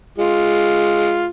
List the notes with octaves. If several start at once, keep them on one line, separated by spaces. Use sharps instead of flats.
G#3 F4